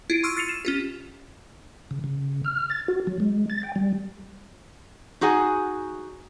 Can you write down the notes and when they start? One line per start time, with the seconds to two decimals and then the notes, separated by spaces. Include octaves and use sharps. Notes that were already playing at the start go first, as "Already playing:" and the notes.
0.10 E4 F4 C7 D7
0.23 C6 C#6 E6 F6
0.36 F6 A6 C7 C#7 D#7 F7
0.49 E7
0.65 C#4 F4 G4
1.91 C#3
2.04 C#3
2.45 F6
2.70 A6
2.88 F#4
3.07 F#3
3.20 G#3
3.50 A6
3.63 G5
3.76 G3
5.21 D#4 F#4 G#4 F#5 G#5